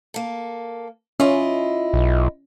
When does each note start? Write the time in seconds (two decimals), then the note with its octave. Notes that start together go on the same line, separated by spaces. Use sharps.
0.14 A#3 A4
1.20 C#4 E4 F4 D#5
1.94 B1